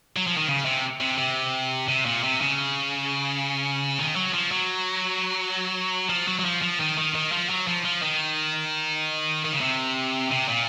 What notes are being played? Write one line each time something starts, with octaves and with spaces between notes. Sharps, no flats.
F#3
F3
D#3
C#3
C3
C3
C3
C3
A#2
C3
C#3
D#3
F#3
F3
F#3
F3
F#3
F#3
F3
F3
D#3
D#3
D#3
F3
F#3
F3
F3
D#3
D#3
C#3
C3
C3
A#2